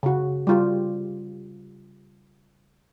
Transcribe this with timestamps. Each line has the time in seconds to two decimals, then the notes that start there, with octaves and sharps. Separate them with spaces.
0.03 C#3 F#4
0.47 G3 F4 G4